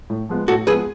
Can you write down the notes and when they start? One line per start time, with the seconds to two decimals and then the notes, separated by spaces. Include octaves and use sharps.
0.10 A2
0.29 F3 G#3 B3
0.48 A2 F#4 A4
0.67 F3 G#3 B3 G#4 B4